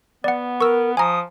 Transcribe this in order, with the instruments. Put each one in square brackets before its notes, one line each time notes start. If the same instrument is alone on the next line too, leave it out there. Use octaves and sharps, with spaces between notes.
[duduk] B3 [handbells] D5 F#5
[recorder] A#4 [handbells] C#6 E6
[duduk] F3 [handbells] G#5 A#5 [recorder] D#6